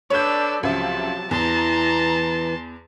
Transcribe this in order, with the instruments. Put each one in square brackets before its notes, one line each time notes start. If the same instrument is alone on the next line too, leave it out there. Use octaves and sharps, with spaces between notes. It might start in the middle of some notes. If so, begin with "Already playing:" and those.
[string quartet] D4 A4 D5 [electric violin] B4 E6 [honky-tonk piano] C#5 G6
[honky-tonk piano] C#2 E5 [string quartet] C3 F3 F#3 [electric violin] A5
[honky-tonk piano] E2 [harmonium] E3 [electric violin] A5 C6 [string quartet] A#5